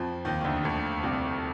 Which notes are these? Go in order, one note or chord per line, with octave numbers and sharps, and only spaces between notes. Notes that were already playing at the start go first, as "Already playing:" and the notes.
Already playing: F2 F3
D#2 D#3
D#3
D2 D3
D2 D3
C2 C3